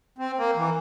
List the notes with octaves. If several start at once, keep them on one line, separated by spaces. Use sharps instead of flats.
C4
A#3
E3